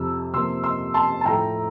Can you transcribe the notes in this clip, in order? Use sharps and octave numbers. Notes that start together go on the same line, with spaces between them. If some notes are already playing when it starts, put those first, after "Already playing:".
Already playing: F2 C3 F3 E6
C3 F3 A#3 C6 E6
C6 E6
A5 C6
A5
A2 F3 A3 G5 A#5